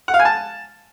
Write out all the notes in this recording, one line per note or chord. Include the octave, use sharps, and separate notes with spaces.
F#5
F5
G#5
A5